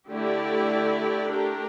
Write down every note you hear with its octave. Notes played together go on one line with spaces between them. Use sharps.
D3 A3 E4 G4 D5
A3 D4 G4 A#4